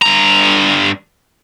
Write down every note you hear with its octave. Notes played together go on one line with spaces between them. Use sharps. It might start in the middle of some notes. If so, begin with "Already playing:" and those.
G2 A#5